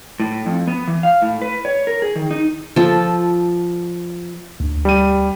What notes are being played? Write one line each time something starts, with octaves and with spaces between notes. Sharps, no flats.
A2
F2
B3
E3
F5
A2
B4
C#5
A#4
G#4
D#3
D#4
F3 A4
D2
G3 D#7